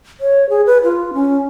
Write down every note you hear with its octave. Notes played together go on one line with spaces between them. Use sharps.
C#5
G#4
B4
F4
C#4